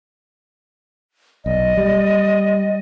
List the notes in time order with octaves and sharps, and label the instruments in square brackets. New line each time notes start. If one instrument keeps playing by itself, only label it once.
[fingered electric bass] B1 [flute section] D5 D#5
[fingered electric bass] G3